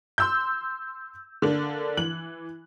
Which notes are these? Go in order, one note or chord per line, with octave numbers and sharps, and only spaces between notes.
C6 E6 G6
D3 A#3 D4
E3 F#6 F#7